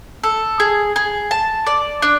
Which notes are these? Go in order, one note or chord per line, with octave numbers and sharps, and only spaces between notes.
A4
G#4
G#4
A5
D5
D4